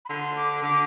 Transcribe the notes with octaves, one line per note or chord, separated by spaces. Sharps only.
B5
D3 C6
D6
D3 D6